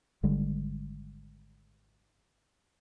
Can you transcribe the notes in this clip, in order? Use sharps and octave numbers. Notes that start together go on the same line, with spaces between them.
G#1 D3 G3 G#3